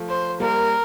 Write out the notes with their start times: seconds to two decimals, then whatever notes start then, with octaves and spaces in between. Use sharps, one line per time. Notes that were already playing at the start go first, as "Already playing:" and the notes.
Already playing: F3 A3
0.09 C5
0.40 G3 A#3 A#4